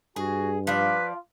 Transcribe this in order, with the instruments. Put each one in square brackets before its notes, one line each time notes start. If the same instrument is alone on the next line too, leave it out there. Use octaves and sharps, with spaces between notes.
[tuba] G2 [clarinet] F#4 [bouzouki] G#4 [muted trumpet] G#5
[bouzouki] F3 D5 [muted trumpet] F4 [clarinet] B4